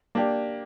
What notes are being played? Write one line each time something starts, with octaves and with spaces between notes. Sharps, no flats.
A#3 D4 G4